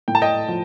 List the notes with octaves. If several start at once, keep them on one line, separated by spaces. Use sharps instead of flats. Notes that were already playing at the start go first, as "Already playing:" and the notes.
A2 G5
A5
D#5 G5
F3